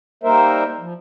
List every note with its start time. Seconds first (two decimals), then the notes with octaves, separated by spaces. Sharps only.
0.23 G3 A#3 D#4 A#4 C5 E5
0.80 F3